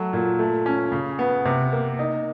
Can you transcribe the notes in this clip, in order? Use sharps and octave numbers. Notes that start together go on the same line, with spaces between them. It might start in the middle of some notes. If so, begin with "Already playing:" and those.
Already playing: F#3 A3
A#2
A3
C#4
C#3
B3
C3
A#3
D#4